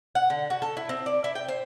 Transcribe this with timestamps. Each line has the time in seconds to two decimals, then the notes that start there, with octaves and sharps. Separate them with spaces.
0.15 F#5
0.30 D3
0.50 F#4
0.62 A4
0.77 E4
0.89 C4
1.06 D5
1.24 E4
1.35 G5
1.48 C5